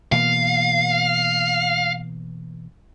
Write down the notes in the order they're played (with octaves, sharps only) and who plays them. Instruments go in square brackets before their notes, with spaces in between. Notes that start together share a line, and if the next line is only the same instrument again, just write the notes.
[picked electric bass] B2 E3 A#3 [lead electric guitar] F5